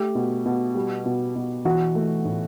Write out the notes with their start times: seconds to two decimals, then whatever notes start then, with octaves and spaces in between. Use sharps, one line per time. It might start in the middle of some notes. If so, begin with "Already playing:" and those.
Already playing: A3 G4
0.15 B2
0.46 B2
0.75 G3
1.06 B2
1.36 B2
1.65 E3 F#4
1.95 A3
2.25 A2